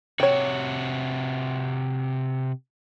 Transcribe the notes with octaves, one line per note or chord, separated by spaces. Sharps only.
C3 F#4 C#5 G5